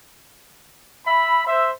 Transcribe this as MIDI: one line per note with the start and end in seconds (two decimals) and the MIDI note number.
1.07 1.42 76
1.07 1.42 83
1.47 1.71 72
1.47 1.71 76